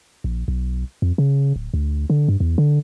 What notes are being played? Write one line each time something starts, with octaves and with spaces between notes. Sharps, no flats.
A#1
B1
F2
C#3
D1
D2
D3
G2
E2
D3